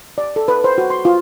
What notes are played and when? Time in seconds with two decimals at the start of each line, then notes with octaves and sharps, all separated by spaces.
0.18 D5
0.36 A4
0.48 B4
0.64 C5
0.78 F#4
0.90 C6
1.05 F4